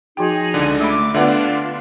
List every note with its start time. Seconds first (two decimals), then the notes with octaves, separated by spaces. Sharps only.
0.17 F3 D#4 F#4 G#4 G5
0.54 C#2 D3
0.81 A3 B5 D6
1.14 D3 B3 D4 F4 B4 D5 E5 F#5